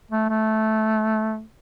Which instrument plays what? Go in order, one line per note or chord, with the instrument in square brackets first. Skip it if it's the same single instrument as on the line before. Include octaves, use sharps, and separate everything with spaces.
[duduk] A3
A3